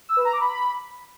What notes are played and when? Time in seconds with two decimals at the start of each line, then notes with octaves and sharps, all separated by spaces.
0.09 E6
0.17 B4
0.25 A#5
0.33 D6
0.41 B5